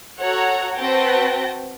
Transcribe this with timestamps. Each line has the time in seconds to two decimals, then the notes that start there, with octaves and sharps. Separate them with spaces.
0.20 F#4 A4 C#5 F#5 A#5
0.76 C4 F#4 B4 G5 A5 A#6